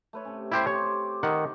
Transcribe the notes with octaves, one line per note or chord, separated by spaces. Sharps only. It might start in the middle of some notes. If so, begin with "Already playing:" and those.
A3 B4 C#5
C3 C#4
E4 G4 C5
G4 C5 C#5
D6
D#3 F#5